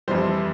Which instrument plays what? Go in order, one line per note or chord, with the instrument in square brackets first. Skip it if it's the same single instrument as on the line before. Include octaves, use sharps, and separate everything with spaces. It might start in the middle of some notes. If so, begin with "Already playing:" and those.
[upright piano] F2 E3 G3 C5